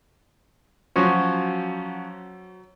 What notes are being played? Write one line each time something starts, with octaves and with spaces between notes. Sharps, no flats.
F3 F#3 C#4 F#4 C5